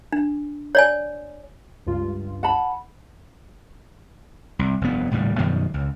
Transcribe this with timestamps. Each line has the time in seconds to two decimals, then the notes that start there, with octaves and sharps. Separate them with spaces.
0.12 D4
0.75 C#5 D5 G#5
1.86 C#2 G2 F4
2.43 F#5 A5 B5
4.59 C2
4.81 F1 G2 B3
5.11 D#1 A2 C#3 G3
5.38 F#2 B2 D#3 F3
5.74 C#2